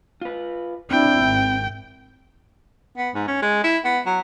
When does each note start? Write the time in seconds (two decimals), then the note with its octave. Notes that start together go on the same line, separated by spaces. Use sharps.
0.21 F4 B4
0.91 C4 D4 E4 G5
1.24 G#1
2.97 B3
3.15 G#2
3.28 C#4
3.42 G#3
3.64 E4
3.84 B3
4.06 F#3